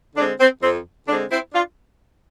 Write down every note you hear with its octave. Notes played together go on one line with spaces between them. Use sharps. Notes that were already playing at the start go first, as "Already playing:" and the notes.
D3 G#3 C4 D4
C4
F2 C4
D3 G#3 C4 D4
C4 E4
D4 F4